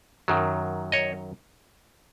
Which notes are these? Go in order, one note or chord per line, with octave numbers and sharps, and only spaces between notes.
F#2 D#3 F#3
C#5 D#5